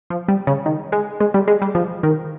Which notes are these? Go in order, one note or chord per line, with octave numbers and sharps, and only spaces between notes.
F3
G3
C#3
D#3
G#3
G#3
G3
G#3
G3
F3
D#3